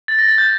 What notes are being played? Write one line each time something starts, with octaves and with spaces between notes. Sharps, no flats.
A6
A#6
A6
G6